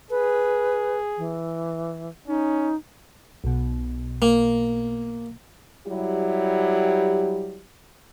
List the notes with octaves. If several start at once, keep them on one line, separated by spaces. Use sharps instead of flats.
G#4 B4
E3
C#4 D#4
B1 B2
A#3
F#3 G3 E4 G4